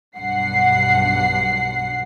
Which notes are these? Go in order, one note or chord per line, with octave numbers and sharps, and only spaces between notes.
B1 G2 F#5 C7